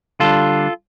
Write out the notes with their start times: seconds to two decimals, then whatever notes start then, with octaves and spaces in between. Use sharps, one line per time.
0.20 D3 G3 D4 F4 A4